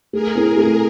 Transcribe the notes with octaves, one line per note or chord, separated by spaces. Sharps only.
A3 G#4 A#4
C4 E4
A3